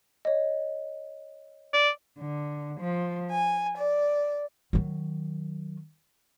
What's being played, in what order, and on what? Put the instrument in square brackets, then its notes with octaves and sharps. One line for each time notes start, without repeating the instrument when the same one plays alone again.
[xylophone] C#5 D#5
[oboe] D5
[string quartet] D3
F3
G#5
D5
[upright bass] D#3 F#3